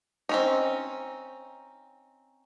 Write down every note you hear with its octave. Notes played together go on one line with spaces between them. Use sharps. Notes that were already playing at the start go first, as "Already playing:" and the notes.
C4 C#4 D#4